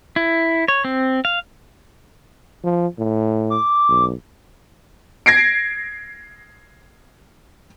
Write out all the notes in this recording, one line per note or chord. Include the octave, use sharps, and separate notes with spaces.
E4
C#5
C4
F5
F3
A2
D6
B1
G#6 A#6 C7 D7